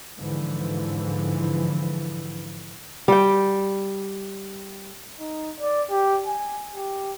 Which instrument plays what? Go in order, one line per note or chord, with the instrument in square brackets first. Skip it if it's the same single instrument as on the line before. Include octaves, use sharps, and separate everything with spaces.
[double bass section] G#2 D3 E3 F3
[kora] G3 G5
[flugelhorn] D#4
D5
G4
G#5
G4